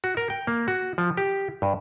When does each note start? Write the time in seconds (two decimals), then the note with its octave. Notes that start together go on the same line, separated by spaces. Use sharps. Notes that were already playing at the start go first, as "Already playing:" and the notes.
0.04 F#4
0.17 A#4
0.30 G5
0.47 A#3
0.68 F#4
0.98 F3
1.17 G4
1.62 G2